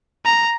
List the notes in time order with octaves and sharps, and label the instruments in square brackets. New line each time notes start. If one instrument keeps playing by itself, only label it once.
[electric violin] A#5